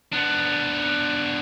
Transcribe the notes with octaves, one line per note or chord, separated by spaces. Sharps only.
B3 D4